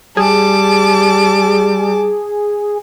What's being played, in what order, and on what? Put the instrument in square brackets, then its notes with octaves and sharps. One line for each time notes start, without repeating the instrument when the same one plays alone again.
[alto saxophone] G3 [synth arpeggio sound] G#4 [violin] A5 D6